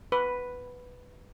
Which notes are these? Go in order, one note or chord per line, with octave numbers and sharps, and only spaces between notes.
B4